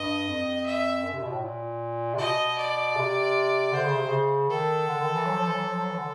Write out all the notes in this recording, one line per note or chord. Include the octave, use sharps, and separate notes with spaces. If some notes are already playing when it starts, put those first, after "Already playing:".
Already playing: G2 D#5
F2
E5
F#2
C3
B2
A2
A#2
C3
B2 D#5
D5
C3
D3 C5
C#3
C3
C#3
D#3 A4
D3
D#3
E3
F#3
F3
E3
F#3
F3
F#3
E3
D3